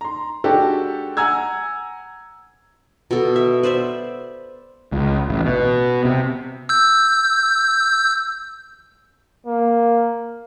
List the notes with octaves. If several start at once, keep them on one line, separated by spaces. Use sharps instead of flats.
A#5 C6
G#3 D4 F#4 G4 A4
F#5 G#5 A#5 E6 G#6
B2 A4
E5
B4 C5 D5 E5
C#2
A1
B2
C3
E6 G6
A#3